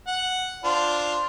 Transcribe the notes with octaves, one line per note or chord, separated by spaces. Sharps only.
F#5
D4 F4 C5